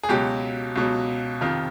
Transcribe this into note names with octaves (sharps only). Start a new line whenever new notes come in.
G#4
C#2 B2 F#3 G4
C#2 B2 F#3
F2 C3 D#3 F4